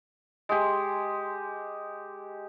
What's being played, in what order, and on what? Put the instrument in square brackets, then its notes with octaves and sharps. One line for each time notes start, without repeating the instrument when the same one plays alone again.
[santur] G#3 G4